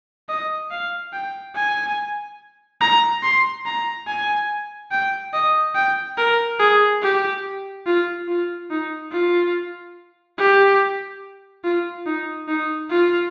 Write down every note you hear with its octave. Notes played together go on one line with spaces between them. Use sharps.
D#5
F5
G5
G#5
A#5
C6
A#5
G#5
G5
D#5
G5
A#4
G#4
G4
F4
F4
D#4
F4
G4
F4
D#4
D#4
F4